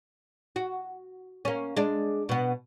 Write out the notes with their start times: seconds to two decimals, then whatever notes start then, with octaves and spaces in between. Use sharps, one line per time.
0.56 F#4
1.45 A#3 C#4
1.77 G#3 D4
2.29 B2 B3